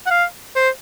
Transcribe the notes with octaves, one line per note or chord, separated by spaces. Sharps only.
F#5
F5
C5